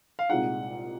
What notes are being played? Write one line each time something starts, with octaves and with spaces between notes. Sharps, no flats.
F5
C2 A#2 G#3 D#4 F#5